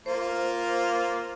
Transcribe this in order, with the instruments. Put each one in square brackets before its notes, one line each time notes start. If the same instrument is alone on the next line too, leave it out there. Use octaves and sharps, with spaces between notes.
[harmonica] A#3 F4 [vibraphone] C5